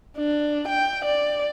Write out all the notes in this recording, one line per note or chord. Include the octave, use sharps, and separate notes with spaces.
D4
G5
D5